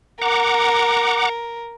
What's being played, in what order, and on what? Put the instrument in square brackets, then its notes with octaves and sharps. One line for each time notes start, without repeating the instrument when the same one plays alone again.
[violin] A#4 [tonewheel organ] F#5 A#5 D6